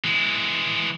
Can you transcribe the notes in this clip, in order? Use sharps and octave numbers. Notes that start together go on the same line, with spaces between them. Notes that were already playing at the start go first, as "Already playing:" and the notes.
E3 G#3